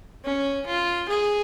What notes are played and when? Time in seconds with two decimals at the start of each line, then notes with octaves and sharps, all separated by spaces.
0.25 C#4
0.66 F4
1.08 G#4